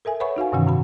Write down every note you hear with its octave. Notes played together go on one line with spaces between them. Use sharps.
A4 A#4 E5 G#5
B4 C#5 E5 F#5 B5 C#6
D#4 F#4 F5 G#5
G2 C3 D#3 E3 C#4 F#5
A2 F#4 B5